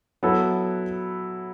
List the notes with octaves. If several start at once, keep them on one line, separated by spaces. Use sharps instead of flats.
F#3 B3 E4 A4